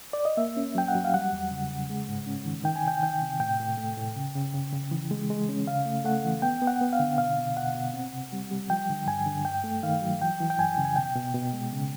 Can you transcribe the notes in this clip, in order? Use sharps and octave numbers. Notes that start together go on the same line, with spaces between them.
D5
D#5
A#3 E5
C#4
F#3 G5
F#5
F#3
F5
G3 F#5
E2
C#3
C#3
G#3
G#2
C#4
D#3
D#3 G5
G#5
C3 G5
D#3 G5
C3
A2 G5
A2
A3
A2
C#3
C#3
C#3
C#3
E3
G#3
G#3
C#4
C#3 F5
A3
A3 F#5
E3
B3 G5
B3
F#5
B3
F5
D3
B2 F5
B2
B2 F#5
B2
C4
C3
G3
G3
F3 G5
D3
G2 G#5
D3
G2 G5
A3
D#3 F5
F#3
E3 G5
E3
G5
F#2 G#5
C#3
G#5
B2 G5
B2
B2
G#3
C#3